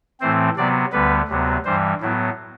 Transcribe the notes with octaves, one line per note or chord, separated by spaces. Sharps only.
A2 E3 A3 C4 C5
C3 F#3 B3 D5
D2 D3 G3 B3 B4
D2 C3 F#3 B3
G2 E3 G3 C5
A2 F#3 B3 E4